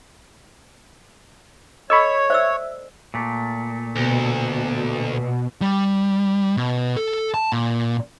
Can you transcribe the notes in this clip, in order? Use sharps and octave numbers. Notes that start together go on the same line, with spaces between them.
A4 C#5 D#5 B5 C#6 E6
C5 D5 E5 E6
A#2 A3
D2 B2
G3
B2
A4
A5
A#2